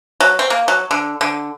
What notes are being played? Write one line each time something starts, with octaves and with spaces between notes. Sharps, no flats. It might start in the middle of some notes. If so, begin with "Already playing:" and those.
F#3
C4
A#3
F#3
D3
D3